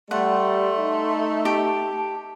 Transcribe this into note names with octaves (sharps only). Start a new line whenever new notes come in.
G3 A3 F#5 C6
D#4
G4 A5